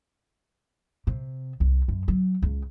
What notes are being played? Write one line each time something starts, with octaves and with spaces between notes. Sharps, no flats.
C3
C2
F#2
F#3
C#2